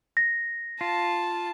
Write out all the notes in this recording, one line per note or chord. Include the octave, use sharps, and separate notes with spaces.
A#6
F4 A5